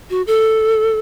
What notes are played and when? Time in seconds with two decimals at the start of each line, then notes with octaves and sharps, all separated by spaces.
0.10 F#4
0.27 A4